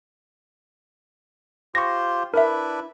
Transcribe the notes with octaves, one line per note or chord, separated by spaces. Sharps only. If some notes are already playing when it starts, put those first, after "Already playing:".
F4 G4 C5 C#6 A#6
D4 E4 A#4 B4 E5